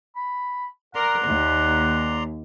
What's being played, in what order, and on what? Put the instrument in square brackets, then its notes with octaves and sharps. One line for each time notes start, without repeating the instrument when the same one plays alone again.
[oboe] B5
[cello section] A#4 [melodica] D5 A#5 C6 [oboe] F#5
[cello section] D#2